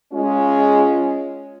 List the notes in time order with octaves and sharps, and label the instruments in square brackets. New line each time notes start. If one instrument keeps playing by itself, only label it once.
[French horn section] G#3 C#4 F4